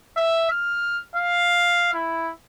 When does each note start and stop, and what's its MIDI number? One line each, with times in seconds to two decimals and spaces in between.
0.16 0.48 76
0.51 1.02 89
1.16 1.92 77
1.93 2.32 64